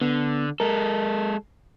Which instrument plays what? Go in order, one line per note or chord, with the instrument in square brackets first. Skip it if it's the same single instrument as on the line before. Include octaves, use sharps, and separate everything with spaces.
[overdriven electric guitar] D3 [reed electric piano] B3
[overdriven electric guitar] G#3 A4 [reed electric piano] A#4